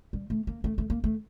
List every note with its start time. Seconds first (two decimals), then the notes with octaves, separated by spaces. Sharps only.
0.13 G3
0.30 A3
0.47 A#3
0.64 A3
0.78 A3
0.90 A#3
1.04 A3